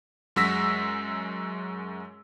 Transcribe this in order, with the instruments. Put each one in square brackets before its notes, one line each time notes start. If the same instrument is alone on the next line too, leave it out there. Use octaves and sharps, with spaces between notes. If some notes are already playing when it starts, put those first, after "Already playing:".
[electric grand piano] F#2 G#3 F#4 E6 A#6 B6